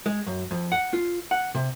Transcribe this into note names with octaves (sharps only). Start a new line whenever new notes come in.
G#3
F#2
F2
F#5
F4
F#5
C3